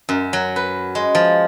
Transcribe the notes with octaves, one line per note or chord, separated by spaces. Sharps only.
F#2
F#3
B4
G#3
F3